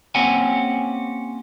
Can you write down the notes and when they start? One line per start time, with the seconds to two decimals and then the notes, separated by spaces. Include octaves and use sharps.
0.15 A#3 C4 C#4 G4 F#5 G#5